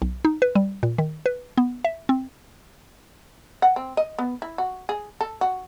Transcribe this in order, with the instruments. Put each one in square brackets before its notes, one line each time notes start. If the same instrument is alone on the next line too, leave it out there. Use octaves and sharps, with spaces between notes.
[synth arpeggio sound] B1
D#4
B4
G3
A#2
D#3
B4
B3
E5
C4
[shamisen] F#5
C4
D#5
B3
E4
F#4
G#4
A4
F#4